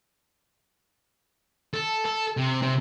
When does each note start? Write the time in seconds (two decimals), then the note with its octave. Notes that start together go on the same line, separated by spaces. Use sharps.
1.74 A4
2.05 A4
2.37 C3
2.62 C3